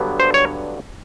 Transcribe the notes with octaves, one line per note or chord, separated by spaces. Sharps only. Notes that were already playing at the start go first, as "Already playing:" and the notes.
Already playing: G2 D3 F#3 B3
C5
C#5